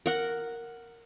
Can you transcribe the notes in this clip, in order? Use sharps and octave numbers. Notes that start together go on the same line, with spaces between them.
A#4 F#5